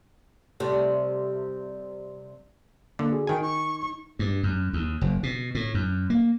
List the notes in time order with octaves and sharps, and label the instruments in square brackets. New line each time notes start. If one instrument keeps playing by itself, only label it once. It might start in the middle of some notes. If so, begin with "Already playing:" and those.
[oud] C3 G3 A3
[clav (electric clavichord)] D3 [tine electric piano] A#3
[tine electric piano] F#4 G#4
[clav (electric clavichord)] D#3 G#5 [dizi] G5
[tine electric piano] D#4 [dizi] C#6
[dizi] C#6
[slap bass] G2
F#2
D#2
F#1
B2
A2
F#2
A#3